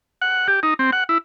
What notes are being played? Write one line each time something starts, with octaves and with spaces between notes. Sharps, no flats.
F#5
G4
D#4
C4
F#5
E4